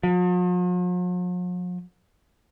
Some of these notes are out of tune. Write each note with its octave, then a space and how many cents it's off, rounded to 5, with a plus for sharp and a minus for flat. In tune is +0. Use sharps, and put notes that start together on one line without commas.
F3 +45